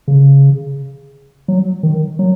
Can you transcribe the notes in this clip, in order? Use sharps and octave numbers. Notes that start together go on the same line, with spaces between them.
C#3
F#3
D#3
F#3